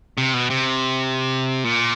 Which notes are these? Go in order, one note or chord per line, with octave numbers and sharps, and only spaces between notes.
C3
B2
C3
A#2